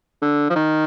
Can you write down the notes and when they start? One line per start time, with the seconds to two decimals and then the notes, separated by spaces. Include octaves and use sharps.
0.22 D3
0.50 F3
0.56 D#3